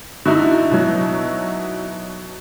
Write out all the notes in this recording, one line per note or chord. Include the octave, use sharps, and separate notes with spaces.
D3 D#4 E4 F#4
B2 F#3